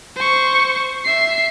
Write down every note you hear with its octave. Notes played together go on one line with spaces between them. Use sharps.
C5 C#6
E5 C7